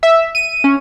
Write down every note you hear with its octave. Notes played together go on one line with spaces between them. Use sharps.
E5
D#7
C#4